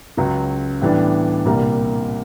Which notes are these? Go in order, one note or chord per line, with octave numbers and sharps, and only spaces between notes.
C#2 C#3 F#3
A2 E3 G3 B3 D4
C2 A#2 G3 A#3